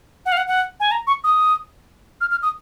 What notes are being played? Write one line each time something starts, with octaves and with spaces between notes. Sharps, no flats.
F#5
F5
F#5
F#5
G#5
A#5
C#6
D#6
F6
F6
D#6